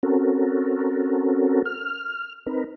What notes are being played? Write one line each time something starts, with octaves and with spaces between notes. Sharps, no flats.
C4 C#4 F#4 A4 A#4
F6
C4 D#4 A#4 B4